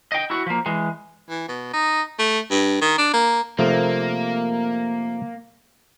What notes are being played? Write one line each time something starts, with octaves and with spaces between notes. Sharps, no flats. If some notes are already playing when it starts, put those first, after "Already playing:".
D#5 G5
E4 F#4
F3 A#3
E3 G#3
E3
B2
D#4
A3
G2
D#3
D4
A#3
C3 F3 A3 A#3